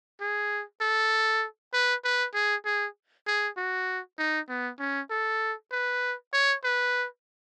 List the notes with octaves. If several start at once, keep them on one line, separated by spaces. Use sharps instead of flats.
G#4
A4
B4
B4
G#4
G#4
G#4
F#4
D#4
B3
C#4
A4
B4
C#5
B4